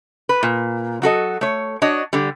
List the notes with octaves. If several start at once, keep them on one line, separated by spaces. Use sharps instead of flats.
B4
A#2
F#3 F#4 A4 D#5
A3 C#5
D4 F#4 C#5 D#5
D3 G3